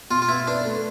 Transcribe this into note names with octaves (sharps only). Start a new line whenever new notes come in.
B2 F4
F4
B3 E4
D4 B4
A3